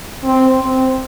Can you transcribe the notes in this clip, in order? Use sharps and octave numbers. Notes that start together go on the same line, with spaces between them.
C4
C4